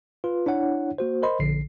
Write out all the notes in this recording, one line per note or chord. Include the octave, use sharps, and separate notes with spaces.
F4 B4
D4 E4 C#5 F#5
A#3 F#4 C5
A#4 C5 D#5 B5 C6
A#1 D3 C7